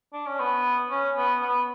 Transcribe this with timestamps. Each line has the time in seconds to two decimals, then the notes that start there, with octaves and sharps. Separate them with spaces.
0.13 D4
0.27 C#4
0.40 B3
0.91 C#4
1.17 B3
1.42 B3